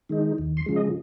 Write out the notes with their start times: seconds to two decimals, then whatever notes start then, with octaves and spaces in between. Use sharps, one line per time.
0.09 D#3 G#3 D#4
0.38 D#2
0.57 C6
0.66 C#3 F3 G#3
0.76 D#5